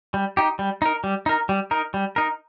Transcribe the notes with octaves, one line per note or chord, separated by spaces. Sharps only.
G3
D#4 G4
G3
D#4 A#4
G3
D#4 A#4
G3
D#4 A#4
G3
D#4 A#4